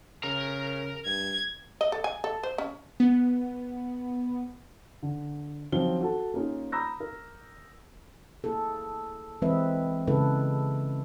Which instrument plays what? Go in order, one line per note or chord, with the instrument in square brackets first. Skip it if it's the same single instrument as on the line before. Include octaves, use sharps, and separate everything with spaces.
[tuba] C#3 [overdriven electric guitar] A#4 A#5
[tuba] G2 [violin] G#6
[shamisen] D#5
A4
G#5
A4
C5
C#4
[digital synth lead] B3
[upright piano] D3
D#3 F3 F#3 C4 G7
F#4 A4 A5
A#3 C#4 D#4 F4 G#4
A#5 B5 D#6 E6 G6 A#6
A#4
[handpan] A#3 E4 G#4 A4
E3 G#3 C4 B4 D#5 E5
C#3 G#3 A#3 E4 A4 B4